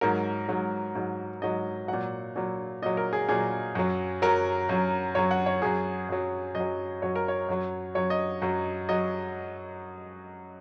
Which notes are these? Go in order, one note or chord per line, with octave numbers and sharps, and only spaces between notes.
G#2 F#3 A#4
G#2 F#3
G#2 F#3
G#2 F#3 D#5
A#2 F#3 F#5
A#2 F#3
A#2 F#3 D#5
A#4
G#4
A#2 F#3 G#4
F#2 F#3
F#2 F#3 A#4
F#2 F#3
F#2 F#3 C#5
F#5
C#5
F#2 F#3 G#4
F#2 F#3
F#2 D#5
F#3
F#2 F#3 C#5
A#4
C#5
F#2 F#3
F#2 F#3 C#5
D#5
F#2 F#3
F#3 D#5